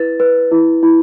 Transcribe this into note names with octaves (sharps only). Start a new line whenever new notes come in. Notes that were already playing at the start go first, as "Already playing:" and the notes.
Already playing: E4 B4 A6
B4
E4
E4